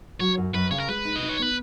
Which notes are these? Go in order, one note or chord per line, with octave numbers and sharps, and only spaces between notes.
F#3 C#5
F#2
F#2 B4
C#3 C#5
A#4
G#3 B4
D#4
D#5
D#4
C#5
B3 B4